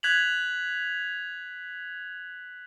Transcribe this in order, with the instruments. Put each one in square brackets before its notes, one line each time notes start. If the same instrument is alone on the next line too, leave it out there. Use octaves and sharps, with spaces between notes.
[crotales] F#6 G#6 B6 F7 F#7